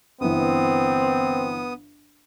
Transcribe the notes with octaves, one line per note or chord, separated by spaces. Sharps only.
G1 E3 B3 C4 D#6